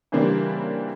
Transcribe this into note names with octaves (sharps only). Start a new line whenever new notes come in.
C#3 E3 G3 A#3 C4 D4